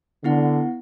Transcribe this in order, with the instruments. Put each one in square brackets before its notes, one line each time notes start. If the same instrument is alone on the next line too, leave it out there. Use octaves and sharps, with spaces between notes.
[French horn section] D3 [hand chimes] B3 E4 F#5